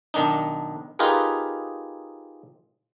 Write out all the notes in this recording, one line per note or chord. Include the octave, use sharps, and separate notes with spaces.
B1 D#3 D4 D#4
D#4 F4 G4 G#4 A#4 B4